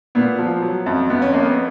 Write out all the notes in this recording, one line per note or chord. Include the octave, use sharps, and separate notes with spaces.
A#2 B3
F3
F#3
F2
F2 B3
C#4
F2 A#3
B3